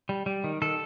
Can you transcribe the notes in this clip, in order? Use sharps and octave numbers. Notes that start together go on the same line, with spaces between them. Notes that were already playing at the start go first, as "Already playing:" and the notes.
G3
G3
D#3
D#3 A4